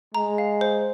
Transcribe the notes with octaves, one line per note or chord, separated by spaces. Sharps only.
G#3 A#5
F5
C5